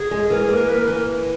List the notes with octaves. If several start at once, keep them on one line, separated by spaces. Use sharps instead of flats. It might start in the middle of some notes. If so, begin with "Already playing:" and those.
Already playing: G#4
G#3
E3 A#4
G#4
A#3
A#4
A#3 B4
A#4
E3